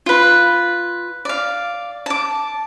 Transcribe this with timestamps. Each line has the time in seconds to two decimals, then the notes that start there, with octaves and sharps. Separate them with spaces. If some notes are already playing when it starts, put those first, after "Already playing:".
0.06 F4 B4
1.25 D5 F5
2.06 A5 D6